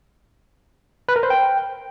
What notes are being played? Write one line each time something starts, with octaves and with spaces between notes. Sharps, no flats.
B4
A#4
C5
G5